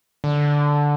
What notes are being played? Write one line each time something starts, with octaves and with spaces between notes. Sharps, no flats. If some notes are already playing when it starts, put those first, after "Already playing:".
D3